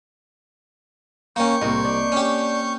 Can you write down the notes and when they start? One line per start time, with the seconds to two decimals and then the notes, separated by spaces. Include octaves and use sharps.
1.36 A#3 C#4 G5 C#6 D6 G6
1.62 C2 A2 A#3 C4 D#5
1.84 D4
2.12 C#4 G4